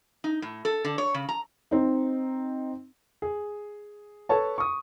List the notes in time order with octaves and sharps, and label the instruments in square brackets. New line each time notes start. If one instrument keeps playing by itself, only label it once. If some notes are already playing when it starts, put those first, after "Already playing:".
[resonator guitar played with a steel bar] D#4
A2
A4
D3
C#5
C#3
A#5
[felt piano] C4 D#4
[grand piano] G#4
A4 B4 C#5 A5
C#6 D#6